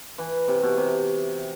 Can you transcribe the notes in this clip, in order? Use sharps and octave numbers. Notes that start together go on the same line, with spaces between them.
E3
C3
B2
C3